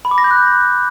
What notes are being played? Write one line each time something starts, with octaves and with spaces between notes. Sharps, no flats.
B5
D6
A#6
G6
F#6